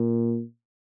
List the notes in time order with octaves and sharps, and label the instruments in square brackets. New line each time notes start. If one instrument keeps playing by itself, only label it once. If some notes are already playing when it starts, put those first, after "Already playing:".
Already playing: [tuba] A#2